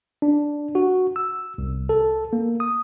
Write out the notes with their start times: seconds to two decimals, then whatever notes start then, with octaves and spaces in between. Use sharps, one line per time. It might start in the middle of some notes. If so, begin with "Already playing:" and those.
0.22 D4
0.75 F#4
1.16 E6
1.58 C2
1.89 A4
2.33 A#3
2.60 D#6